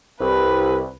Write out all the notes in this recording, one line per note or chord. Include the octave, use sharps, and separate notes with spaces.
C2 B4